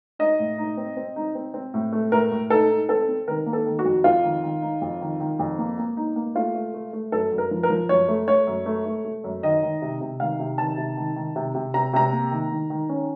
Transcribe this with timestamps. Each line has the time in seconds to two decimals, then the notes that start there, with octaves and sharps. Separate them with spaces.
0.19 D#4 D#5
0.39 A2
0.58 D#4
0.77 C4
0.97 C4
1.16 D#4
1.35 C4
1.54 C4
1.74 A2
1.93 A3
2.12 A2 A#4
2.31 A2
2.50 D#4 A4
2.70 D#4
2.89 C4 A4
3.08 C4
3.28 D#3 A#4
3.46 A#3
3.53 A4
3.66 D#3
3.79 F#4
3.85 F2
4.04 F2 F4
4.24 D#3
4.43 D#3
4.62 D#4
4.81 F2
5.01 D#3
5.20 D#3
5.39 F2
5.59 A#3
5.78 A#3
5.97 D#4
6.16 A#3
6.35 A3 F4
6.55 A3
6.74 A3
6.93 A3
7.12 F#2 A4
7.32 F#2
7.38 A#4
7.51 F3
7.63 A#4
7.70 F3
7.89 F#2 C#5
8.08 A3
8.27 A3 C#5
8.47 F#2
8.66 A3
8.86 A3
9.05 A3
9.24 F#2
9.43 D#3 D#5
9.63 D#3
9.82 C3
10.01 C3
10.20 D#3 F5
10.39 C3
10.58 D#3 A5
10.78 C3
10.97 D#3
11.16 D#3
11.36 C3
11.55 C3
11.74 C3 A#5
11.93 C3 A#5
12.13 A#3
12.31 D#3
12.51 D#3
12.70 D#3
12.89 C#4